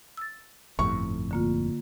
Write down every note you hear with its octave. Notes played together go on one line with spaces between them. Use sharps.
E6 A6
G1 F2 A2 C#6
D3 A#3 F4